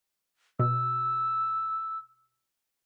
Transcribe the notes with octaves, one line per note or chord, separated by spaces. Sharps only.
B2 E6